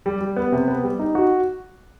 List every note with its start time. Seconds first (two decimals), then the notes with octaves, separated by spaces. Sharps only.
0.06 G3
0.21 G3
0.36 B3
0.52 C3
0.68 B3
0.84 G3
0.99 D#4
1.15 F#4